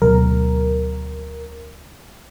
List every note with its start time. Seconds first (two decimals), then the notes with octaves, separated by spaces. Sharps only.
0.02 D2 B2 F#3 A#4